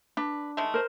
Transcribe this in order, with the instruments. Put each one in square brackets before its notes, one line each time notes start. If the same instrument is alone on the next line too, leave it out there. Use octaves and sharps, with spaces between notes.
[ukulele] D4 [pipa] B4
[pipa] D#3 G#3 A3
[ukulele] A#4 C5